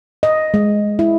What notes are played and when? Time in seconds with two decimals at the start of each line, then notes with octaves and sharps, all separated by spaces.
0.23 D#5
0.54 G#3
0.99 E4